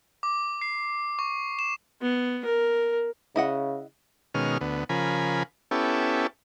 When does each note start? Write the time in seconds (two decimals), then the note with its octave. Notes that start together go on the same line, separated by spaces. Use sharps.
0.23 D6
0.61 C7
1.19 C#6
1.59 E7
2.02 B3
2.45 A#4
3.36 C#3 E4 D#5 F#5
4.34 B2 D#3 G#3 C#4 F6
4.61 D2 B3
4.89 C#3 F3 A#4 G#5 B5
5.71 B3 C#4 E4 G4 A4